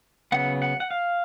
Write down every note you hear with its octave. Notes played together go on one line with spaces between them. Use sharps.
C#3 F#3 B3 F#5
F#5
F#5
F5